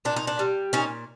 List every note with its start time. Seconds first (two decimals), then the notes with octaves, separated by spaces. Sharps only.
0.05 A#2 D4
0.16 D#4
0.27 D4
0.39 G3
0.73 A#2 C#4 D#4